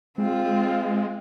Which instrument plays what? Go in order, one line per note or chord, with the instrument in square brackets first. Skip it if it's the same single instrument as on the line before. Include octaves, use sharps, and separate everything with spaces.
[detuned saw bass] G#3 [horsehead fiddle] C4 F4